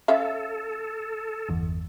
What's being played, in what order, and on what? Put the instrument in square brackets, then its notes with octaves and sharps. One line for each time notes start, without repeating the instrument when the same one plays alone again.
[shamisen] C#4 E5 F5 [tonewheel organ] A4
[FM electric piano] G1 E2